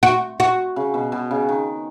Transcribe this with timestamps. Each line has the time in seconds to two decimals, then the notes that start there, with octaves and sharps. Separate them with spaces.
0.03 F#4
0.40 F#4
0.76 C#3
0.94 B2
1.12 B2
1.31 C#3
1.49 D#3